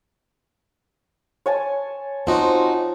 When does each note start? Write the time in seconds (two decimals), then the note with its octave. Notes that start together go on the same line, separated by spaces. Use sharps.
1.46 C#5 G#5 A5
2.27 F3 C4 D#4 F#4